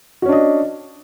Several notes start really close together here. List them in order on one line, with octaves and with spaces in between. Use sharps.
F#4 C#4 D4 D#5